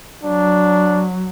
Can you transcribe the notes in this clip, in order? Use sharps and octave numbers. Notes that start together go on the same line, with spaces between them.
F#3 D4